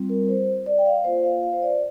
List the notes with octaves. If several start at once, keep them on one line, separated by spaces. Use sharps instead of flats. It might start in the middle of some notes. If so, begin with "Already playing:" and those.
Already playing: G3 C4 F4
A#4
C5
D5
G5
F5
A#3 F4 C5
F5
F5
C5
D5